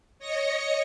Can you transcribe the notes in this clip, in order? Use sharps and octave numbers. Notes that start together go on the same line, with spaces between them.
C#5 D#5 A#6 C#7